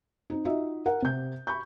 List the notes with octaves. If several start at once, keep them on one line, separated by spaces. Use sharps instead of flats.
C4 D#4
D#4 F4 F#4 D#5 E5
A#4 F#5
C3 G6
B5 C#6 G6